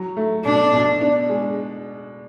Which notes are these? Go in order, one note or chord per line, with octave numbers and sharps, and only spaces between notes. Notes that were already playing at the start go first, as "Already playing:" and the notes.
Already playing: F#3
A3
B2 D4
B2
D4
G#3